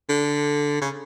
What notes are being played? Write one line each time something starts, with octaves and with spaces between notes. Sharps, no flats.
D3
C#3